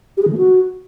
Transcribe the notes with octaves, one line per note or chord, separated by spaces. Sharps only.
G4
G#4
D#3
A3
F#4